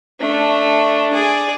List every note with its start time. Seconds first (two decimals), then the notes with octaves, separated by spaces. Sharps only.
0.20 A3 D4
1.14 G#4 D5